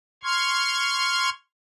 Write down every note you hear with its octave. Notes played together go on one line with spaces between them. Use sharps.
C6 C#6 F6 G#6